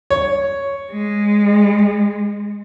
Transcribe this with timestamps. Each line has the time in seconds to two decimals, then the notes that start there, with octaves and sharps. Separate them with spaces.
0.10 C#5
0.91 G#3